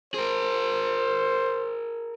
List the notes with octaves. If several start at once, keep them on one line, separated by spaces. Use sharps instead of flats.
G#4 A#4 C5